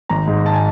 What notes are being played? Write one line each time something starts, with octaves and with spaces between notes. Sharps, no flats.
G#1 A#5
G#2
A5
G#5